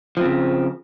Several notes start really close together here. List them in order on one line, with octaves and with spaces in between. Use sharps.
F3 C4 C#3